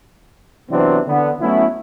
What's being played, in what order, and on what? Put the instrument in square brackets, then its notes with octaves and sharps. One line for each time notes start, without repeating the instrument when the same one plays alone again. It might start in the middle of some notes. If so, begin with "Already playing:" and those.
[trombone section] C3 E3 F#3 B3 C4 D4
D3 B3
F#3 A3 B3 C#4 E4